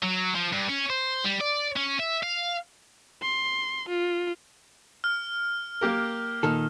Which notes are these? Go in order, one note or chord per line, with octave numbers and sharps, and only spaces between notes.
F#3
F3
G2
C#4
C5
G3
D5
C#4
E5
F5
C6
F4
F6
A#3 G4 A#4
A#2 D#3 A4